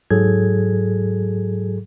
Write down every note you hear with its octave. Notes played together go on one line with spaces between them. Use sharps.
G#2 F#3 G#4 A4 G#6